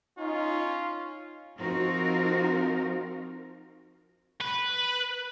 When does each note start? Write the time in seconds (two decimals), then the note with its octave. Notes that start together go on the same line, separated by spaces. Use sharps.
0.19 C#4 D#4 F4
1.59 F3 C4 D#4 F4 F#4 A#4
4.41 B4